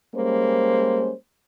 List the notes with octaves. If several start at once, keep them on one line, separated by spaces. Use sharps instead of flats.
G3 G#3 A#3 C#4 C5